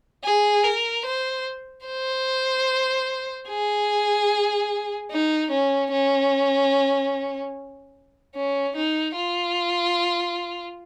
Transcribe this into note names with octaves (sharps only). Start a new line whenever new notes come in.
G#4
A#4
C5
C5
G#4
D#4
C#4
C#4
C#4
D#4
F4